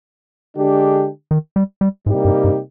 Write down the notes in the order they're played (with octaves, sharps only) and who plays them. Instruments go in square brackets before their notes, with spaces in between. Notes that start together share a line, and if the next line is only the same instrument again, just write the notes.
[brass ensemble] D3 G#3 D4 G4
[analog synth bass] D#3
G3
G3
[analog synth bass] G#2 [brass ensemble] C3 G3 A#3 D#4 G4
[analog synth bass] G2
G2